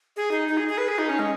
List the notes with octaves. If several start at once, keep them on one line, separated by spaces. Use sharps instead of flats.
G#4
D#4
D#4
G#4
G#4
B4
G#4
D#4
C#4
G#3